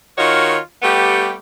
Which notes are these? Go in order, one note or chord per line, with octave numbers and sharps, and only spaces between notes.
D#3 F4 F#4 C#5 D#5
G3 A3 B3 G4